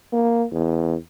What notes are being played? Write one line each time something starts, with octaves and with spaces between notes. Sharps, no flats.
A#3
E2